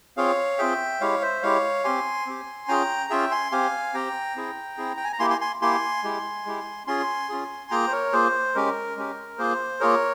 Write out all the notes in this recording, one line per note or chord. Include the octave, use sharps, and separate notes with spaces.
C4 F4 G#4 C#5 F5
C4 F4 G#4 E5 G5
G#3 E4 G4 C#5 F5
C5 E5
G#3 E4 G4 C#5 F5
C4 G4 G#5 C6
C4 G4
C#4 F4 G#4 G5 A#5
C#4 F4 G#4 E5 G5
G#5 C6
C4 G4 F5 G#5
C4 G4 G5 A#5
C4 E4 G#4
C4 E4 G#4
G5
G#5
A#5
A#3 E4 G4 G#5 C6
G#5 C6
G#5 C6
A#3 E4 G4 G#5 C6
G#3 E4 G4
G#3 E4 G4
C#4 F4 G#4 G#5 C6
C#4 F4 G#4
A#3 F4 G#4 G5 A#5
C5
A#4 C#5
A#3 F4 G#4 C5
G#3 C#4 G4 A#4
G#3 C#4 G4
A#3 F4 G#4 C5
A#3 F4 G#4 A#4 C#5